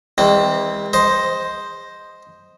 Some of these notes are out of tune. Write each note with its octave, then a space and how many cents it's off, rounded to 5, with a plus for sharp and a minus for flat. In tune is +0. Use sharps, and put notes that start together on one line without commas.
E3 -35 G#3 -40 C4 +0
C5 +0 D#5 +0 C6 +40